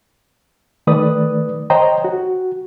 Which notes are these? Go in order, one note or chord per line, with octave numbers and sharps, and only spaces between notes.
D#3 A3 B4 D5 D#6
C5 C#5 D#5 G5 A#5
F#4